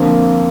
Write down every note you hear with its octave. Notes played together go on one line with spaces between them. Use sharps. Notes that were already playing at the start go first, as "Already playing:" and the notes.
Already playing: F2 D3 F3 A#3